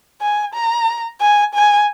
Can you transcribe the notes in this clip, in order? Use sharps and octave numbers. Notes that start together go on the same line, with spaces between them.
G#5
A#5
G#5
G#5